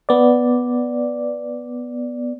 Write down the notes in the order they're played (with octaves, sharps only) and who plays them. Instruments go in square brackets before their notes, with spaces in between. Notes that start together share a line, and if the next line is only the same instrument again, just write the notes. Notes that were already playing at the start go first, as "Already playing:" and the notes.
[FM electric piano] B3 D5